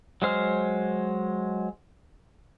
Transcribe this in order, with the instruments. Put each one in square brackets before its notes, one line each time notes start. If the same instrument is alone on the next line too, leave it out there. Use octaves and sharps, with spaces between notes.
[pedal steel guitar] F#3 G#3 C5 F6